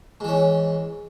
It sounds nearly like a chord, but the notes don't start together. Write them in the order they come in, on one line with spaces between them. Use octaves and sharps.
G#2 E3 C#4